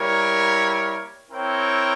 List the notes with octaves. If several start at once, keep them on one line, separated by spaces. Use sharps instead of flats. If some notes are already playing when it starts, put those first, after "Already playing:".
Already playing: G3 A#3 E4 A#4 C#5
C4 E4 A#4 C#5 G5